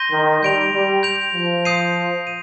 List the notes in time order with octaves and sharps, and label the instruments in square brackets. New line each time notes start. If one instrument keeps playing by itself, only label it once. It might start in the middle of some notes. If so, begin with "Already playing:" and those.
Already playing: [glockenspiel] C6 G6 A#6 D#7 G7
[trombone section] D#3
[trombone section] G3 [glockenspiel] G6 D7 F7
[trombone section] G3
[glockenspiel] G6 D7 F7
[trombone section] F3
[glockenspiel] D#6 G6 C7 D#7
D#7